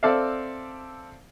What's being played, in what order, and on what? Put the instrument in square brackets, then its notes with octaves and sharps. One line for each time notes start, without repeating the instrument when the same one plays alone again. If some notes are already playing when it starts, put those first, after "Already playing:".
[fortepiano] C4 A4 D5 E5 F5